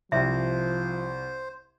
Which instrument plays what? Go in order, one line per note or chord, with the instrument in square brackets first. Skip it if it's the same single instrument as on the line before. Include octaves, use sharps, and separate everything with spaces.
[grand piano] C2 G4 [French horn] F3 [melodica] C5 [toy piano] E5